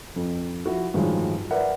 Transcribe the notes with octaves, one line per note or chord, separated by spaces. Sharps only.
F2
F3 E4 F#4
A1 G2 D#3 F3 F#3 G#3
A#4 B4 D5 E5 F#5